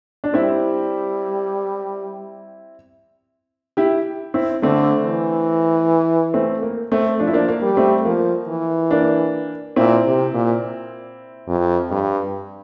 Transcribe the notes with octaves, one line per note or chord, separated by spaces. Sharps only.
D4
G3 C4 E4
E4 G4
C4 E4
D3 A3 C4
E3
A3 C4
A#3
A3 C4
F3 D4
E4
A#3 D4
A#3
G3
A3 C4
F3 A#3
E3
A#3 D4
A#2 C4 E4
C3
A#2
F2
G2